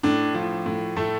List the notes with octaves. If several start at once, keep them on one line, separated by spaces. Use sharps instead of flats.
A2 D4
F3
A2
A2 A3 A4